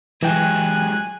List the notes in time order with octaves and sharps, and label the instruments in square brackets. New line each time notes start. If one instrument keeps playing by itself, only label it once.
[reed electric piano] E3 G5 [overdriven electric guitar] F#3 G#3 [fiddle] G#5 [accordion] F#6